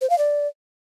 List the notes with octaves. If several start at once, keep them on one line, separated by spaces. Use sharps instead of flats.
C5
F5
D5